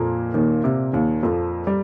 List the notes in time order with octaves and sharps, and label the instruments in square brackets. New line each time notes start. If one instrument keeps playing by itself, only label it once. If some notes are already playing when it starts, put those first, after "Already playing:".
Already playing: [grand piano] F2 F3 [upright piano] A#2 A#3
[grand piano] D#2 D#3
C3
D#2 D#3
F2 F3
G3